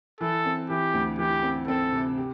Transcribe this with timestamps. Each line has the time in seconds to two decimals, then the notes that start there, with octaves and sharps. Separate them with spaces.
0.21 E3 A4
0.45 C4
0.70 E3 G4
0.94 D2
1.19 E3 G4
1.43 C4
1.68 C4 A4
1.92 C3
2.17 G4